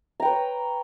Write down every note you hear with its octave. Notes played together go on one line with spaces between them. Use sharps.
B4 C#5 G5 A#5